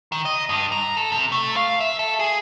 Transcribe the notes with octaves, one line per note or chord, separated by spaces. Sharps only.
D#3
D#5
G2
A#5
A4
C3
A3
F5
E5
A4
G#4